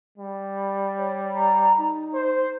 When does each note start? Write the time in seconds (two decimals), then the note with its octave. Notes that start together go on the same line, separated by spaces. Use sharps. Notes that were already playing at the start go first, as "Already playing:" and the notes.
0.18 G3
0.98 C#5
1.36 A#5
1.78 D#4
2.14 C5